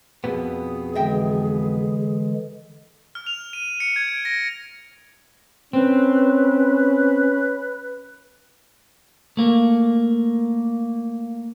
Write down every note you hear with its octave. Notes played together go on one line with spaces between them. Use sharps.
F2 B2 B3 G#4
D3 E3 G#3 D#5 E5 G5
F6
F7
D#7
C#7
G#6
D7
A#6
C4 C#4 B4
A3 A#3